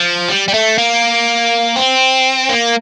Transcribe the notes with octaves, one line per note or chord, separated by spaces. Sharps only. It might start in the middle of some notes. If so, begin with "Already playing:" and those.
Already playing: F3
G3
G3
A3
A#3
C4
A#3